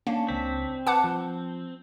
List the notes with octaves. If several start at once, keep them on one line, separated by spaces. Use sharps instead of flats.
A#3 C#4 D4
C#2 C4 B6
B4 F#5 A5 D6 F#6
F3